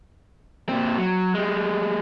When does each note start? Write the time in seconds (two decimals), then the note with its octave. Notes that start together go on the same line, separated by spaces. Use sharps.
0.69 A#2 C4
0.98 F#3
1.34 G3 G#3